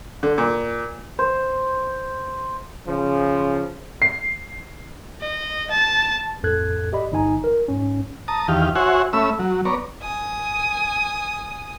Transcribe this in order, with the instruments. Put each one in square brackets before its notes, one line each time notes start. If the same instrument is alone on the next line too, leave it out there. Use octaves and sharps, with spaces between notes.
[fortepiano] D3
A#2
[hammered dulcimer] C5
[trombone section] C#3 F3
[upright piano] C7
[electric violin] D#5
A5
[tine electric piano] A#1 F2 A2 A4 F#6 G#6
G4 D5 D#5 B5
G1 D#4 G#5 A#5
A#4
G#2 C#4
[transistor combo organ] A5 A#5 D#6
E2 D#3 G4 F5
F#4 C5 C#5 E5 F#5 G#5
A3 C#4 E5 B5 E6
F#3
B3 C#5 D5 A#5
[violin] G#5 D#6